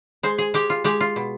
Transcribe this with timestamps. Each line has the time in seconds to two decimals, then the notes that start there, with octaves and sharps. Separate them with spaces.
0.23 G#3 C5
0.38 G#4
0.54 G#3 G4
0.70 F4
0.84 G#3 G4
1.00 F4
1.16 B2